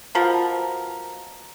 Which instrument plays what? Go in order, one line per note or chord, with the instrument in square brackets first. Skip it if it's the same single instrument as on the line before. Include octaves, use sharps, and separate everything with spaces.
[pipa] B2 F3 A#4